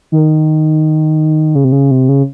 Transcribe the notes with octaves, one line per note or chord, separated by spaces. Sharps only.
D#3
C#3
C3
C#3
C3
C#3